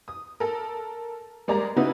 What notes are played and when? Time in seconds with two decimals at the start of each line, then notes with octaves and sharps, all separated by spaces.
0.08 D#6
0.40 A4 A#4
1.48 G3 G#3 A#3 D5 A#5
1.76 C#3 D#4 E4 F#4 B4